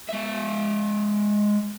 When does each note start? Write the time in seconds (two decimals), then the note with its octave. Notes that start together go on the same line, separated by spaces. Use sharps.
0.09 G#3 E5